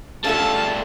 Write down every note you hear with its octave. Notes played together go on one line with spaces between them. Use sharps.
G3 A3 C#4 F4 A4 E5 F5 A5